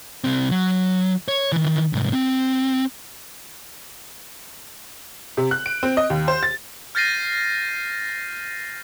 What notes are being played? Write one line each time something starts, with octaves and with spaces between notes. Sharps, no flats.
C2 C4
F#3
C#5
D#3 E3
C2 G#2
C4
C3
F#6
D7
C4
D#5
D#2
C5
A6
F6 G6 A6 A#6 C7 D#7